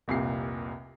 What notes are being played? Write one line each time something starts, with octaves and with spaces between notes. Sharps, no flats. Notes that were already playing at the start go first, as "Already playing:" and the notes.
F1 C2 A#2 C7